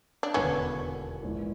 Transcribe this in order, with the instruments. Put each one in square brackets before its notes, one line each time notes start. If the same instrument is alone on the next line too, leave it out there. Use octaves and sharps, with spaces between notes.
[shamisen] D4
[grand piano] E1 D#2 D3 [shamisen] B3 C#4
[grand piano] A#1 G#2 E3